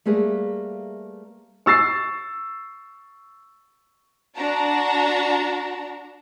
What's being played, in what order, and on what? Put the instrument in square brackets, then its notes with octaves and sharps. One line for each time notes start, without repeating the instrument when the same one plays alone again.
[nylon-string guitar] G3 A3 A#3 G#4 B4
[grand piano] C#6 E6 A6 C7
[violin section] D4 F#4 A5 A#5